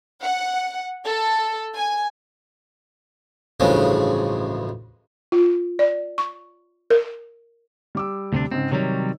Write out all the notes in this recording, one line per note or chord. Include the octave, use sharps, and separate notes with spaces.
F#5
A4
G#5
A1 D2 G2 C#3 F3 G#3
F4
D5
C#6
A#4
G3 D6 E6
D2 C3 D4
G#2 C#3 C4
C3 D#3 F#3 G3 C#5